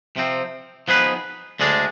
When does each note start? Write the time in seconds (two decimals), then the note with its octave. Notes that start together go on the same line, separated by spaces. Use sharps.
0.16 C3 F3 C4
0.88 F3 B3 D#4 G#4 B4
1.60 D2 D3 G#3 D4 G#4